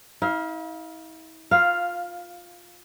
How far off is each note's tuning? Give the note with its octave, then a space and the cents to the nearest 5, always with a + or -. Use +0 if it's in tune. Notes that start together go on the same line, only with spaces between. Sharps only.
E4 -45 F5 +0
F4 +15 B4 -30 F5 +0